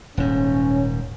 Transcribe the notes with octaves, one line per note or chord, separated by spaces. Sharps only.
D#1 G#2 C#4